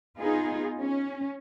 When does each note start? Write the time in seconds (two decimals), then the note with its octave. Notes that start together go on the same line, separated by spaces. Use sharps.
0.18 B3 D#4 F4 G#4
0.80 C#4